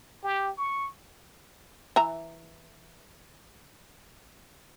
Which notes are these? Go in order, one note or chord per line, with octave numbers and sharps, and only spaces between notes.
G4
C#6
E3 E5 A#5